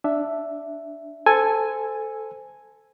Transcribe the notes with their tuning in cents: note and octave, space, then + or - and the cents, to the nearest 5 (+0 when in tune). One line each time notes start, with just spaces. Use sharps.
D4 +0 E5 +5
A4 +0 C5 -20 G#5 +0